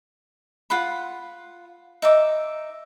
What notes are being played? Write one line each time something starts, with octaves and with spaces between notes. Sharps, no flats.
F4 F#5 B5
D#4 E5 D6